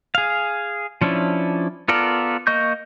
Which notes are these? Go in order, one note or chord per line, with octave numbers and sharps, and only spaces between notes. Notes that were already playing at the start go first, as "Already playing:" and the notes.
G#4 F5
F3 C#4 D4 E4
B3 F4 A4 A#4 D5
A#3 D#5 C#6 G6